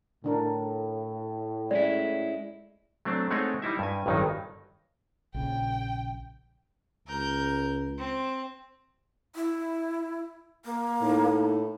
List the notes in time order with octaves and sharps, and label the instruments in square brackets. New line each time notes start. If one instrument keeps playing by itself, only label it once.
[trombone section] A2 [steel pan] D3 D4 A#4
[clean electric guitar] G#3 C#4 E4 [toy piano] D5
[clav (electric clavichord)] F#3 A3 C4 D4
G#3 A3 C4 D#4 C#5 F#5
G3 D#4 E4 E5
G2 G#5
A1 G2 D#3 F#3 D#4
[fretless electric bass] A#1 C#3 [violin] G5
[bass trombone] C#2 [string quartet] A#4 G6
[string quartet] C4
[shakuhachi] E4
A#3
[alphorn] A2 [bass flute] D#4